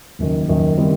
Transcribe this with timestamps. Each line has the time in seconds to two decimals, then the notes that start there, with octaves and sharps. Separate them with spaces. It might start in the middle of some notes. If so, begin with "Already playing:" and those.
0.19 F#1 F#2 D#3
0.49 F#1 F#2 D#3
0.78 D#3 G3 C4 E4